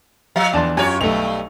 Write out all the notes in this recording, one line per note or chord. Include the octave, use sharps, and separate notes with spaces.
F3 F5
E2 D4 A5 C6
F#2 F4 G4 C#5 G#5
B1 G2 A3 F7